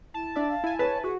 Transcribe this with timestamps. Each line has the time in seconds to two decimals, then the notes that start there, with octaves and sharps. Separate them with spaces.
0.14 E4 A5
0.35 D4 D5 E5
0.49 F5
0.64 E4 G#5
0.79 B4 C#5 A5
1.04 F#4 G#4